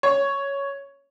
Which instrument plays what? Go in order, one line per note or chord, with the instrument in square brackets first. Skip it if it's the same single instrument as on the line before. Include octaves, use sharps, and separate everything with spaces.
[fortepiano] C#5